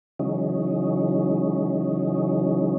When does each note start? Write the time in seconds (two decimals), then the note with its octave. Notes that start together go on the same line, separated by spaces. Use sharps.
0.19 C#3 E3 F#3 G#3 C#4 D#4